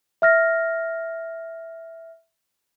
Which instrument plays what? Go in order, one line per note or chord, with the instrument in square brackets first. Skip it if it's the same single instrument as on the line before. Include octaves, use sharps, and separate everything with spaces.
[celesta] E5 F6 A#6